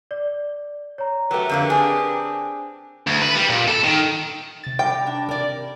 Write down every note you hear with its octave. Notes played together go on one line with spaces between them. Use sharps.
D5
C#5 A#5
F#3 A3 G4 A#4 B4
F2 D3 A#3
C4 D4 G#4 G#5
D2
B4
G3
A#2
A4
D#3
C3 A6
G3 G5 A#5
D4
C3 A#4 D5